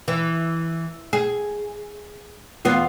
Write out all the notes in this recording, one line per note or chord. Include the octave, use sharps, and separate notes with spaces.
E3
G#4
E2 B3 F4